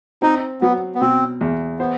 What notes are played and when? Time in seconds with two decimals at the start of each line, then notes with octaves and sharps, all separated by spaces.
0.22 C4 D#4
0.61 F#3 B3
0.95 B3
1.00 B2 C4
1.41 E2
1.79 B3 C5